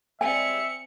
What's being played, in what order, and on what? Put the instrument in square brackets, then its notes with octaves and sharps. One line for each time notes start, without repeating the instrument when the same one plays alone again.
[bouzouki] G3 G#3 E4 [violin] C4 C#7 [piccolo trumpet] E5 [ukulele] G#5